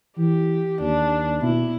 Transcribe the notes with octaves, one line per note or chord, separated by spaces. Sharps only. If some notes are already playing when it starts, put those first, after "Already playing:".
E3 G4
D#2 D4
B2 E4